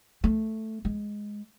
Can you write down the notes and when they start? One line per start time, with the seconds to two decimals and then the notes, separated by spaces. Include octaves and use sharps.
0.24 A3
0.85 G#3